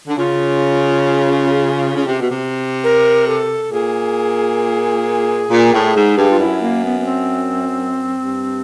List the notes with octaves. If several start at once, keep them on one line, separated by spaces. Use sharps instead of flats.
D3
C#3 F4
C#3
C3
B2
C3
A#4
A4
A#2 G#4
A#2
A2
G#2
G2
F4
F#2 E4
A#3
B3
B3
C4
G2